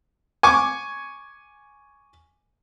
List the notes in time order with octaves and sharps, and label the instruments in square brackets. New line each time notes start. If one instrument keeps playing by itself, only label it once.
[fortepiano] G#5 C#6 D6